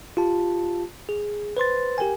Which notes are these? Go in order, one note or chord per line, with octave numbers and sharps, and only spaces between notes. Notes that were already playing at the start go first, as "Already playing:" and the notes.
F4 G4 A5
G#4
B4 C5 C6 A6
G4 A#4 G5 G#5